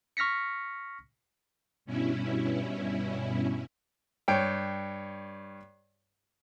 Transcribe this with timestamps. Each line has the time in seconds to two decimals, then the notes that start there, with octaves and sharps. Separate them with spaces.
0.17 C#6 F6 A#6 B6 C#7
1.85 G2 B2 C#4 E4
4.28 G2 C#5 G5